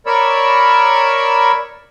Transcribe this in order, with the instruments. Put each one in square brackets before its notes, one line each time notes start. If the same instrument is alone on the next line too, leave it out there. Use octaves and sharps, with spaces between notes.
[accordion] A#4 C#5 D5 B5 C#6 E6